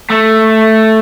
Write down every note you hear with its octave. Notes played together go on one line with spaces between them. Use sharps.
A3